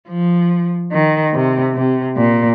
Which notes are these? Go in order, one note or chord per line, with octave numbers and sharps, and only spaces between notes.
F3
D#3
C3
C3
A#2